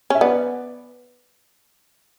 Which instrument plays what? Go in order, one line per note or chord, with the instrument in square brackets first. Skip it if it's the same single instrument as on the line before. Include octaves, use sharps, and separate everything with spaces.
[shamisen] C#4 [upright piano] E5
[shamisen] B3 [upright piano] B4 D5